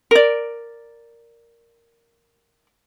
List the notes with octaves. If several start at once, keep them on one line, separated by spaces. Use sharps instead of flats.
A#4 D5